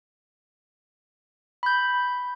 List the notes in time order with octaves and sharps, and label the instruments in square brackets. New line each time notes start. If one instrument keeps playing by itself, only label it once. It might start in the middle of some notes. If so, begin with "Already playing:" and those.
[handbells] B5 G6